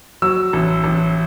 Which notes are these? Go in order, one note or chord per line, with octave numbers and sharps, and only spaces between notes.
F#3 E6
A1
A1